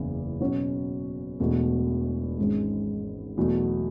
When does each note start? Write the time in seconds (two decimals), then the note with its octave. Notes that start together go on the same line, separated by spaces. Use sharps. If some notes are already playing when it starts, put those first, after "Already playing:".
Already playing: F#1 E2 C#3
0.40 B2 F#3 C#4 F#4 C#5
1.40 E1 E2 B2 A3
2.38 G#1 G#2 G#3 C#4
3.37 E2 B2 F#3 A3